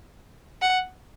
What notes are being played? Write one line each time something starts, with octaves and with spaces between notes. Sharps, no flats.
F#5